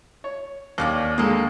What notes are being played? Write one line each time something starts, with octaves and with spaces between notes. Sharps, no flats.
C#5
D#2 A#3 C#4 D5
D3 G#3 A#3 A4 D#6